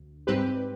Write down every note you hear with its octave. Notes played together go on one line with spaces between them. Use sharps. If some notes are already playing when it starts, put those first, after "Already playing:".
Already playing: D2
G#2 G3 C4 G4 B4